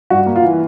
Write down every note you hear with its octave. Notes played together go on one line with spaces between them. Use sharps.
G2 F#4
A#3
F4
E3